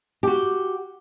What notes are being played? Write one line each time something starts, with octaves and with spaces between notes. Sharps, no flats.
F#4 G4